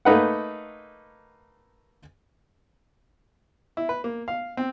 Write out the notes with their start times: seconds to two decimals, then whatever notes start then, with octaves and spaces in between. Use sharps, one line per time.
0.05 A3 A#3 D#4 B4 F#5
3.77 E4
3.89 B4
4.04 A#3
4.28 F5
4.57 C4